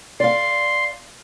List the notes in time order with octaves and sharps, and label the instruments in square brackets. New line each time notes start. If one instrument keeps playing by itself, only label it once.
[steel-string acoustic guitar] D5 F5 [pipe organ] C6